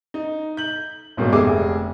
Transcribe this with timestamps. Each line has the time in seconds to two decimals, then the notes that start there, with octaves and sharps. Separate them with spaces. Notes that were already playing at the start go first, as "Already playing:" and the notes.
0.14 D#4
0.57 G6 F#7
1.17 B1 G#2 B2 D3 A#3
1.32 F1 D3 G#4 E5 D6